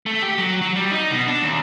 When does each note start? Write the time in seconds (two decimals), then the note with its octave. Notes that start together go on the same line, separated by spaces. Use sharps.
0.06 A3
0.22 G4
0.38 F#3
0.61 F#3
0.76 G3
0.91 D#4
1.12 B2
1.28 D4
1.43 D#2